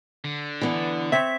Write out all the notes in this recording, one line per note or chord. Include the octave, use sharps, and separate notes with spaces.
D3
E3 B3 D4
C4 C#5 E5 B6